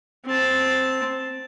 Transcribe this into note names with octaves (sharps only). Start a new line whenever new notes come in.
C4 A5